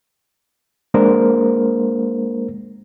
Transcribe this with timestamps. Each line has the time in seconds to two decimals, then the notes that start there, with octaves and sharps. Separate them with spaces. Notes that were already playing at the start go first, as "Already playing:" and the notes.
0.94 G#3 A#3 D4 A#4 C5